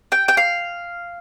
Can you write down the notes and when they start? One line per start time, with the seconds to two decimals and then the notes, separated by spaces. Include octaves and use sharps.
0.12 G5
0.28 G5
0.37 F5